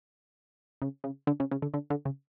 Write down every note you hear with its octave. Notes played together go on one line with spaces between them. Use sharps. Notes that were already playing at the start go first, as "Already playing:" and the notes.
C#3
C#3
D3
C#3
C#3
D3
D3
D3
C#3